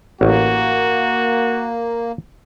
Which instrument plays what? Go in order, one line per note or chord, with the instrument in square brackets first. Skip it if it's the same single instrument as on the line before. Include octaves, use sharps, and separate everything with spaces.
[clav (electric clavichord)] A1 [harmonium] A#3 [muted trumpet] F#4